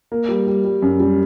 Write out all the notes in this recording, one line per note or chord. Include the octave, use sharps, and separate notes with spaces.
A#3
G3
G3
G3
F#2
G3